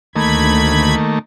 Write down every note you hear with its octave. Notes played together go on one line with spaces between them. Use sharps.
D2 D#3 A3 A#3 B5 G#6